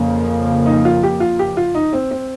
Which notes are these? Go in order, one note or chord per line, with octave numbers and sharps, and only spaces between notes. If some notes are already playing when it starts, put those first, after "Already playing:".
Already playing: F2 C#3 F3 A#3
D#4
F4
G4
F4
G4
F4
D#4
C4
C4